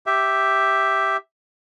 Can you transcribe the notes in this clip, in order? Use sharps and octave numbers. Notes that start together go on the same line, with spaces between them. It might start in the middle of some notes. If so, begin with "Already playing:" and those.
G4 E5